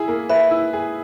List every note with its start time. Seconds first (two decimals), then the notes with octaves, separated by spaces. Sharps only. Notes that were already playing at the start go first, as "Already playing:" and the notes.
Already playing: E4 G#4
0.08 A#3
0.30 B4 E5
0.51 E4
0.73 G#4